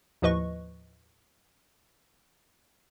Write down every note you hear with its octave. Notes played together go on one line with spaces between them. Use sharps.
D#2 A2 F3 B4 D#5 C#6